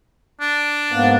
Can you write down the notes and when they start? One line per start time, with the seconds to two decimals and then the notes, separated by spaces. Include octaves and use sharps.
0.41 D4
0.92 G#2 A#3 B3